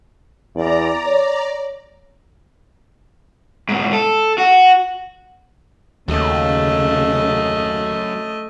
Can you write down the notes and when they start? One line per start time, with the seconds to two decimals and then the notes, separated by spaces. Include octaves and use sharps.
0.55 E2 D5 A#5
1.06 C#5
3.69 G#2 B2
3.93 A4
4.38 F#4
6.08 D#2 C#3 F#3 A3 C#4 D#5